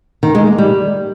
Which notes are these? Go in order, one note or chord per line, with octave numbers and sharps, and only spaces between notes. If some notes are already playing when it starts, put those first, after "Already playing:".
D#3
G#3
A#3
G3